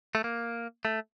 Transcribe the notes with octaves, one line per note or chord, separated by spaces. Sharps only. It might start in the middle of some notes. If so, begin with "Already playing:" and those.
A3
A#3
A3